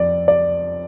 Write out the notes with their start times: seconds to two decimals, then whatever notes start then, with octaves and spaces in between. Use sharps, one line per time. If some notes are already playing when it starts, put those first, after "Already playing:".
Already playing: F2 D5
0.28 D5